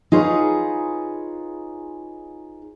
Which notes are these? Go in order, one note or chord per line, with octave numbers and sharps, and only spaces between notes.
D#4 F4 G#4 B4 C#5